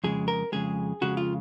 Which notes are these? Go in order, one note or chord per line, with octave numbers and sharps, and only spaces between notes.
F2 C#3 G#3 G#4
A#4
F2 C#3 G#3 G#4
F2 C#3 G#3 F#4
F4